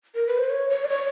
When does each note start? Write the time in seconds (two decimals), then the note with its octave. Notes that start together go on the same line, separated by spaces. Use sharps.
0.15 A#4
0.27 B4
0.38 C5
0.50 C#5
0.70 C#5
0.84 D5
0.89 C#5